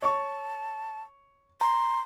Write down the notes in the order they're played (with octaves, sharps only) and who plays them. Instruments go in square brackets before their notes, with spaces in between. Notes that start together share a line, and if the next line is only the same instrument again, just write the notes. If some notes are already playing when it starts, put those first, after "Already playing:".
[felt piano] C#5 C#6 [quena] A5
[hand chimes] A#5 [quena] C6